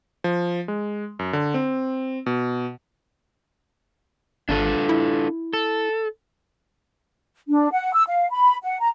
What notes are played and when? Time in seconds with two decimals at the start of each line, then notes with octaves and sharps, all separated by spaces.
0.24 F3
0.68 G#3
1.19 F#2
1.33 D3
1.54 C4
2.26 B2
4.49 G#1 D4 F4 A4
4.89 E4
5.53 A4
7.48 D4
7.72 F#5
7.94 E6
8.08 F5
8.31 B5
8.63 F#5
8.80 A#5